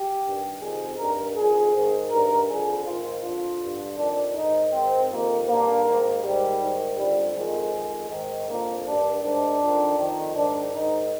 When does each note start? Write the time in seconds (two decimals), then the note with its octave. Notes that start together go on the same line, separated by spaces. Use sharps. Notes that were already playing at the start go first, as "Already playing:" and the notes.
Already playing: G4
0.22 G2 D#3
0.59 F2 C3 D#3 G#4
0.97 G2 D#3 A#4
1.35 F2 D#3 G#4
1.72 G#2 D#3
2.10 G2 D#3 A#4
2.47 F2 D3 G#4
2.85 G#2 D#3 F4
3.22 F2 D3 F4
3.60 G2 D3
3.97 F2 D#3 D4
4.34 G#2 D#3 D#4
4.72 G#2 D#3 C4
5.09 F2 C3 D#3 A#3
5.48 G2 D3 A#3
5.84 G#2 D#3
6.22 G#2 D#3 G3
6.60 G#2 D#3
6.97 F2 D3 G3
7.34 F2 D#3 G#3
7.72 F2 D#3
8.09 G#2 D#3
8.47 F2 D3 A#3
8.85 G2 D#3 D4
9.22 G#2 D#3 D4
9.60 F2 D#3
9.97 F2 D#3
10.34 G#2 D#3 D4
10.71 G#2 D#3 D#4